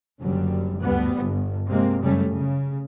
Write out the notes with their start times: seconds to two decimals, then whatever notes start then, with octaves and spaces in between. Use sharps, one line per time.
0.18 F#1 F#2 D3 G3
0.81 D2 G2 G3 B3
1.19 G1
1.68 C3 G#3 A#3 C4
2.02 F#2 C#3 G3 A3 C#4
2.32 C#3